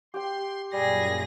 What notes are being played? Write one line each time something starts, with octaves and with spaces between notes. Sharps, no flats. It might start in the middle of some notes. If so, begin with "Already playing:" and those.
G4 G5 C6
F#2 A#2 G3 G#4 A#6